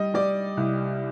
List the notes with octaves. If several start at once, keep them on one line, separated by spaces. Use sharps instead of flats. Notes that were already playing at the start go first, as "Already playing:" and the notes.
Already playing: G3 D#5
G3 D5
C2